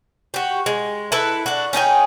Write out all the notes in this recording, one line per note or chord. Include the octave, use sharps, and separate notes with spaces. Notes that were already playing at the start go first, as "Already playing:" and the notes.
F#4 G4
G#3
E4 A4 B4
D4 F#4
C#4 D#4 G#4 G5